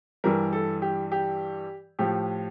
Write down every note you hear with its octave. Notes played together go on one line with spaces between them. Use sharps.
G2 E3 G3 A#4
A4
G4
G4
A2 F3 G4